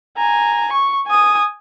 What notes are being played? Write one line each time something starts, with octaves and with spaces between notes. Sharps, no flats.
G#5 A#5
C#6
G#5 D#6